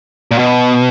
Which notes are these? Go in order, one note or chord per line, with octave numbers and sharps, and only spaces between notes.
A#2
B2